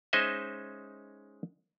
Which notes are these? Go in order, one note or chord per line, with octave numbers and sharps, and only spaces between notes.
G#3 C#4 D#4 C5 D#5 E5